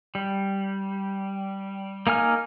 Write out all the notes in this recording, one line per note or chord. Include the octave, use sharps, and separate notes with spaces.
G3
A#3 D#4 G#5 F6